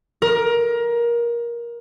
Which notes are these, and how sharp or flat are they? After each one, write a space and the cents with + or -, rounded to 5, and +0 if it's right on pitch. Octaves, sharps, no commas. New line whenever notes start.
A#4 +20